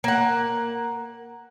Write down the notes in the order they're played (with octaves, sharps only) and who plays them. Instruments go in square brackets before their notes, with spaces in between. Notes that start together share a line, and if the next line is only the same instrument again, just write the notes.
[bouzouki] A#3 F#5